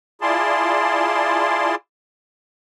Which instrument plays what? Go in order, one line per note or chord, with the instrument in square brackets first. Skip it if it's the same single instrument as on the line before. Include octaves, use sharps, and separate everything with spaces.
[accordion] E4 F4 G#4 D5 A5 C6